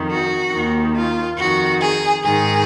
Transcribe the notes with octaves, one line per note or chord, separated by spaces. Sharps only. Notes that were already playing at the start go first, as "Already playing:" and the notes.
Already playing: F2 D#3
F#4
D#2 D#3
F4
F2 D#3 F#4
G#4
G#2 D#3 G#4